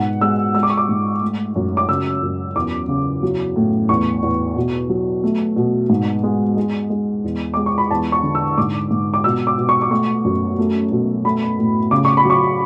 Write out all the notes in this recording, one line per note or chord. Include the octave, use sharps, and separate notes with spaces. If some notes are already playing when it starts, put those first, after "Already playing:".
Already playing: G#2 B2 F#5
G#3 E6
G#3 E6
D6
C#6
D6
G#2
A3
F#2
D6
C#3 E6
F#2
E2 D6
C#3
F#3
A2
E2 C#6
E2
B2
F#3
A3
B2
G#2
G#3
G#3
G#3
E2
G#3 D6
C#6
B5
E2 A5
C#6
D3
E6
G#2 D6
G#2
D6
B2 E6
D6
B2
C#6
D6
A3 C#6
F#2
A3
B2
A3 B5
A2
C#3 D6
C#6
B5
F#3 C#6